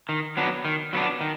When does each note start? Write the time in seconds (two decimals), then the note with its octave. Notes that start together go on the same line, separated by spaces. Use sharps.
0.09 D#3
0.37 F#3 B3 D4
0.65 D#3
0.93 F#3 B3 D4
1.21 D#3